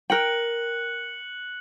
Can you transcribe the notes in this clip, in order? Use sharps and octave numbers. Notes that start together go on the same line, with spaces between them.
A#4 G5 F#6 C#7 F#7